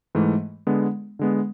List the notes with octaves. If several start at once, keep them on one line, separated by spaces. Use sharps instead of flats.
G#2 E3 A3
D3 G#3 B3
D3 G#3 B3